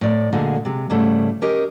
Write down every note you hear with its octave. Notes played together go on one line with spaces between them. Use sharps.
A2 D5
D2 A#2 D3 G#3 G#4
C3 G#3
G#2 C#3 G3 A3 E4
C#4 G4 G#4 A#4 D#5